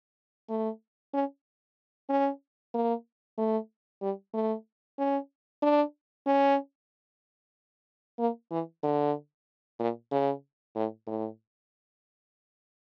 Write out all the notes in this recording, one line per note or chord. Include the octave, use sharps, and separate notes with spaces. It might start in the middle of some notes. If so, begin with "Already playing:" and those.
A3
C#4
C#4
A#3
A3
G3
A3
C#4
D4
C#4
A#3
E3
D3
A#2
C#3
A2
A2